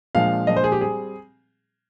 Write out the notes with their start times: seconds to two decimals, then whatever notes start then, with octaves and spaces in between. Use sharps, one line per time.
0.15 A#2 F3 G#3 D4 F5
0.47 A#2 F3 G#3 D4 D#5
0.56 C5
0.64 G#4
0.72 G4
0.81 G3 C4 G#4